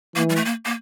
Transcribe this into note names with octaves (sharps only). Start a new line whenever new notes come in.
E3 A#3
G3
A3
A#3
A#3